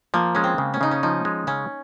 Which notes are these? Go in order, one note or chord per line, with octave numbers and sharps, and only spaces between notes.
F3 A#3
G#3 C#4
C4
C#3
C#4
C#3 D#4
C#4
F3 D#4
G#3
C#3 C#4